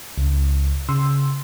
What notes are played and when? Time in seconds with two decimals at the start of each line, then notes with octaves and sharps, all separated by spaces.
0.18 C#2
0.89 C#3 C6 E6